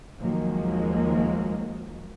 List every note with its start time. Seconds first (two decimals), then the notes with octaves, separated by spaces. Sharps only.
0.21 D#2 D#3 F3 F#3 G#3 A#3